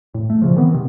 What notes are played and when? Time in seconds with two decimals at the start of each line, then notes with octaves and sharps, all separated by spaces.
0.14 A2
0.30 A3
0.42 A#2 C#3 F3
0.56 D#3 E3 B3 C4
0.74 C3